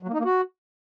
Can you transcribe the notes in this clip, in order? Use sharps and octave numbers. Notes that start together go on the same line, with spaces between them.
F#3
A#3
D#4
A#3
F#4